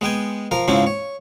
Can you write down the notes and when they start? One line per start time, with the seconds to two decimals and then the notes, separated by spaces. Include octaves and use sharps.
0.01 G#3 B3 G5 G#5
0.51 F3 A#4 F5
0.68 G#2 C#3 F3 C4 C#4 E4
0.86 C#5